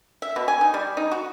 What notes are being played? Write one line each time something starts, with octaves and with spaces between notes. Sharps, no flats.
E5
B2
G#5
D#4
G3
D#4
F#4